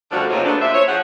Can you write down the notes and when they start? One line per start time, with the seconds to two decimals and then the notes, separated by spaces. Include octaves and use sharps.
0.12 F#2 D3 F3 G3 A3 F#4
0.30 F#2 A#2 C#3 C4 D#4 C#5
0.45 F#3 A3 B3 D4
0.61 F#2 A#2 C5 E5
0.74 C#5
0.88 F3 G#4 F#5